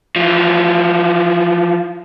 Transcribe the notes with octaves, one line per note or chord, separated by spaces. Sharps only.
E3 F3